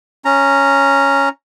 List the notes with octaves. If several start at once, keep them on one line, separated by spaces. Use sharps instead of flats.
C#4 A#5